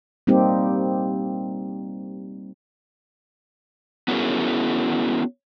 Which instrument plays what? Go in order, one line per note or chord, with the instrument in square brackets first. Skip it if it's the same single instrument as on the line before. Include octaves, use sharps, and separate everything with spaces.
[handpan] G3 A#3 C4 D#4 G4
[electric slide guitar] B3 C#4 E4 F#4 G#4 A#4